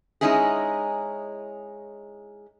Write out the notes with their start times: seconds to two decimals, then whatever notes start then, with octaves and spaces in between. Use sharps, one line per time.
0.21 G#3 C#4 D#4 E4 G#4